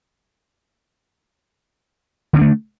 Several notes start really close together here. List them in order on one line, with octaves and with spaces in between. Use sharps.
D3 C4 D4 A3